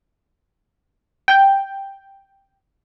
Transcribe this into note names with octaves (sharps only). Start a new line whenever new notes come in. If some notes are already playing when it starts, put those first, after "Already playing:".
G5